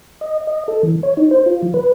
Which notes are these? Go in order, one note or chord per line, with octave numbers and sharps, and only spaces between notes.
D#5
D#5
A4
E3
C#5
D#4
C5
F4
F3
B4